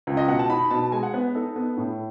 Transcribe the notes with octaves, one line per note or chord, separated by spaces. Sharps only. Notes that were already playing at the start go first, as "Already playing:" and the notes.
C#2
D#5
B2 F#5
A5
D#4 B5
B2 A5
G#3 G#5
F#5
B3 B4
D#4 A4
B3
A2